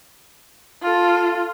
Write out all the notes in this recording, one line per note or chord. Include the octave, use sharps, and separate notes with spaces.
F4 A4